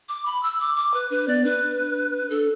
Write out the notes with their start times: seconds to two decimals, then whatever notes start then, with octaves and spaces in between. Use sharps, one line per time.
0.09 D6
0.26 B5
0.43 E6
0.60 D6
0.76 D6
0.94 B4
1.10 D4 B4
1.28 B3 D5
1.45 D4 B4
2.30 D4 A4